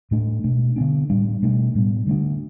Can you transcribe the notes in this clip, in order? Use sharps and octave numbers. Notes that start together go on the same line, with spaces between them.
A2 A3 D4
B2 A3 D4
D3 B3 D4
A2 G3 D4
B2 A3 D4
A2 G3 B3
D3 A3 D4